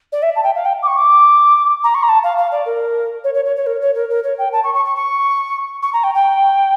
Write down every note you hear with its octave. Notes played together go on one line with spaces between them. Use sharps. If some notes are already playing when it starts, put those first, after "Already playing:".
D5
E5
A5
G5
F5
G5
D6
C#6
D6
A#5
C#6
A#5
A5
F5
F5
D5
A#4
C#5
C#5
C#5
C#5
A#4
C#5
A#4
A#4
C#5
G5
A5
C#6
C#6
C#6
C#6
C#6
A#5
G5
G5